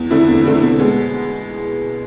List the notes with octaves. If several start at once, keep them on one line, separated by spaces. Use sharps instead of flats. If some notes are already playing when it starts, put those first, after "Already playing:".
Already playing: E2
D3 A3 C4 E4
E2
D3 A3 C4 E4
B2
G#3 B3